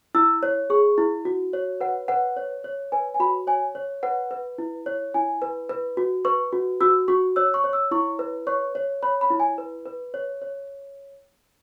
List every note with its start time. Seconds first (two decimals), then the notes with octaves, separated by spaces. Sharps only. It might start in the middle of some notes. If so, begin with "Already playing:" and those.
0.15 E4 E6
0.43 C#5
0.70 G#4 C#6
0.98 E4
1.25 F#4
1.53 C#5
1.81 B4 F#5
2.08 B4 F#5
2.36 C#5
2.64 C#5
2.92 B4 G#5
3.14 G#5
3.20 F#4 B5
3.47 C#5 G#5
3.75 C#5
4.03 B4 F#5
4.31 B4
4.58 E4
4.86 C#5
5.14 E4 G#5
5.42 B4
5.69 B4
5.97 F#4
6.25 B4 C#6
6.53 F#4
6.81 F#4 E6
7.08 F#4 C#6
7.36 C#5 E6
7.54 C#6
7.64 C#5
7.73 E6
7.91 E4 C#6
8.19 B4
8.47 C#5 C#6
8.75 C#5
9.03 C#5 B5
9.21 B5
9.30 E4
9.40 G#5
9.58 B4
9.85 B4
10.14 C#5
10.42 C#5